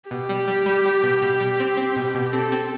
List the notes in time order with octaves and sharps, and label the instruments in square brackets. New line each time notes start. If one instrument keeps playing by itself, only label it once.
[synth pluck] B2 [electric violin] G4
[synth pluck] G3
G3
G3
G3
B2
B2
G3
C4
C4
B2
B2
[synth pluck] C4 [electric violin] A4
[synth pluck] C4